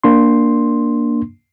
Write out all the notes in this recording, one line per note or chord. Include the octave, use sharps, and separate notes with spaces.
A#3 D4 C6